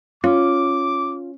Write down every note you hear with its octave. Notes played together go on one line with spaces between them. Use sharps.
C#4 F4 D6